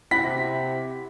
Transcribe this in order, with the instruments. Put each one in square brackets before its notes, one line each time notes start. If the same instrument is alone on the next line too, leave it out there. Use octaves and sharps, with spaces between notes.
[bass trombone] C3 [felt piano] E4 [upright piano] F#5 B5 A#6 [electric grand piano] B6